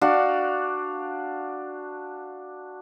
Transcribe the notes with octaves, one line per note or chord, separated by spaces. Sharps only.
D4 F#4 F5